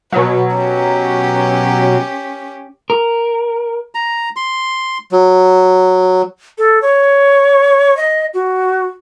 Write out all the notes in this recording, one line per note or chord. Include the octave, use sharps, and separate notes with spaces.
B2 F#3 B4
C#4 G4
A#4
A#5
C6
F#3
A4
C#5
D#5
F#4